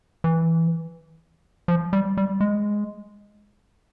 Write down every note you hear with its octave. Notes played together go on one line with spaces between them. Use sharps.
E3
F3
G3
G3
G#3